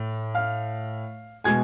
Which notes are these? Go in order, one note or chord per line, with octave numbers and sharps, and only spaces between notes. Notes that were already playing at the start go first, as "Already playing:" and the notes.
Already playing: A2
F5 F6
B2 G#3 G#5 G#6